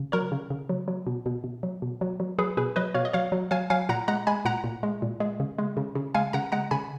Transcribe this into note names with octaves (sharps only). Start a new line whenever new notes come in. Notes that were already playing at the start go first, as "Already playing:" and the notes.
Already playing: C#3
F#3 A#4 C#5
C#3
C#3
F#3
F#3
B2
B2
B2
F#3
B2
F#3
F#3
F#3 G#4 B4
B2 G#4 B4
F#3 B4 D#5
B2 C#5 F5
D#5
F#3 C#5 F5
F#3
F#3 F5 G#5
F#3 F5 G#5
A#2 F#5 A#5
G#3 F#5 A#5
G#3 G#5 B5
A#2 F#5 A#5
A#2
G#3
A#2
G#3
C#3
G#3
C#3
C#3
G#3 F5 G#5
C#3 F#5 A#5
G#3 F#5 A#5
C#3 G#5 B5